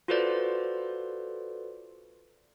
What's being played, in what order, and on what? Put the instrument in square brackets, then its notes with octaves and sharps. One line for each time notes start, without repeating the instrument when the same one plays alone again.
[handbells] F4 F#4 A4 B4 C5 D5